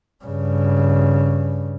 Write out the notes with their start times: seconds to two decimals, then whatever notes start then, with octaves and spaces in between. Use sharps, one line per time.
0.25 G2 C#3